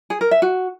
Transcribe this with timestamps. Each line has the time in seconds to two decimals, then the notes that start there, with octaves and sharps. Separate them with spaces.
0.10 G#4
0.21 A#4
0.31 E5
0.42 F#4